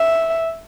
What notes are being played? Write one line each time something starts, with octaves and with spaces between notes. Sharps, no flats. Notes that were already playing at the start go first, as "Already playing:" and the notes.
Already playing: E5